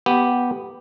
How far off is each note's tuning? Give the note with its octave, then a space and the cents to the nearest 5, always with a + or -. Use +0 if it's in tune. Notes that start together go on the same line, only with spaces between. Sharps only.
B3 +0 G4 +0